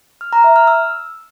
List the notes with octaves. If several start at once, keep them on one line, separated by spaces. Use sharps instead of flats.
F6
A#5
E5
F6
E6